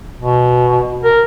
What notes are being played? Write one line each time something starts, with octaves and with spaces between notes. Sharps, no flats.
B2
A#4